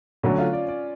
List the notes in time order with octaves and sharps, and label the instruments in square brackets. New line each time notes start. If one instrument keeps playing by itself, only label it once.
[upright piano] D3 F#3 A3 [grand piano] C#4
[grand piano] F4
D5
D5